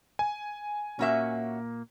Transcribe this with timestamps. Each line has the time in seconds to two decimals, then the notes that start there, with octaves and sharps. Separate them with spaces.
0.19 G#5
0.99 A#2 A#3 C#4 F#4 E5